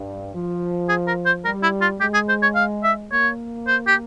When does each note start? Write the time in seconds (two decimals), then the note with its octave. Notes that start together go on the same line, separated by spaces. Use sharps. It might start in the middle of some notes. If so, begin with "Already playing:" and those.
Already playing: G2
0.33 F3
0.89 G#4
1.07 A#4
1.26 C5
1.45 G3 A#4
1.63 E4
1.81 F4
2.00 G#3 G4
2.14 G#4
2.29 C5
2.42 C#5
2.56 F5
2.84 E5
3.11 A#3 C#5
3.68 C5
3.87 G4